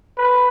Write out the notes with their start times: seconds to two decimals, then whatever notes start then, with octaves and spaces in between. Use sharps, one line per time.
0.18 B4